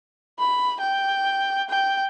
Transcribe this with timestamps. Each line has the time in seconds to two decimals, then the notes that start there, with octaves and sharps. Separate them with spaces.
0.39 B5
0.80 G5
1.69 G5